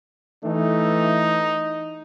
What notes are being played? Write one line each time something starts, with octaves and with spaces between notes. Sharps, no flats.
E3 A3 D#4